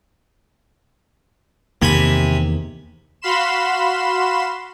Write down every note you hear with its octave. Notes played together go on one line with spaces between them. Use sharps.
E2 C3 D#3 A#3 G#5 B5
F#4 F5 B5 C6 E7